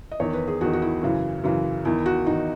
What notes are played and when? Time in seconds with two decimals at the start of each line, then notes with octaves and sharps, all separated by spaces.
0.11 D#5
0.20 E2 C#5
0.25 D#3
0.33 B4
0.48 G#4
0.61 E2 D#3 F#4
0.73 F#4
0.82 E4
1.03 F#2 C#3 E3
1.44 F#2 C#3 E3
1.85 E2 D#3 E4
2.06 F#4
2.27 E2 D#3 D#4